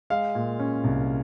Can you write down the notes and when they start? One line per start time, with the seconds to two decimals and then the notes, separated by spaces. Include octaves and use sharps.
0.10 G#3 F5
0.35 A#2
0.59 C#4
0.84 C2